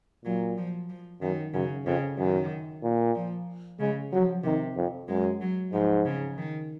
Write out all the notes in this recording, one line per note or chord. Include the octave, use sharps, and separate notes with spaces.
A#2 F#3
F3
F3
F#2 D#3
F#2 C#3
F2 C#3
F#2 D#3
A#2
F3
C#3 G#3
F3 F#3
C3 D#3
F2
F#2 G#3
F#3
G#2 F3
C#3
D#3